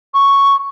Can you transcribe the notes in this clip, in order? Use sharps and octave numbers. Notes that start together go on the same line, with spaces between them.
C#6